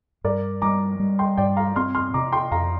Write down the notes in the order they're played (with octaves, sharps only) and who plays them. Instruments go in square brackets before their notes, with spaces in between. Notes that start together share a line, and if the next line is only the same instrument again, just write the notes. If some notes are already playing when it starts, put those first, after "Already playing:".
[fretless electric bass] G2 [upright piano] A#4 D5
[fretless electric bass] G3 [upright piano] A#5 D6
[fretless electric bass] G3
[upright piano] G5 C6
[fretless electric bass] G2 [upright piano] D5 G5
[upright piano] F5 A#5
[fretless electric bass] C4 [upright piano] C6 F6
[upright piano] C6 F6
[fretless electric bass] C3 [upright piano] A#5 D6
[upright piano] G5 C6
[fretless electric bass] F2 [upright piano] F5 A#5